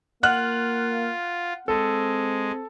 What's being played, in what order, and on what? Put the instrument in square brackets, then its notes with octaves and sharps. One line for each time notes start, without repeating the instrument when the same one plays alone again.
[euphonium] A#3 [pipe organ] F4 [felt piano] F#5 F6 F#6
[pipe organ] G#3 [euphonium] C4 [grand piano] A4